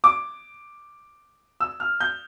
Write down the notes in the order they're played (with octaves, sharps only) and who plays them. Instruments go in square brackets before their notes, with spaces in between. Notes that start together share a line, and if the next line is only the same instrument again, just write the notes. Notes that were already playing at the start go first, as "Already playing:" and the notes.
[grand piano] D6
E6
F6
G6